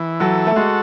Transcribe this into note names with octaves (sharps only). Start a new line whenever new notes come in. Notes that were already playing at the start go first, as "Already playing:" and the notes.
Already playing: E3
F#3 A4
A3
G#3 F#4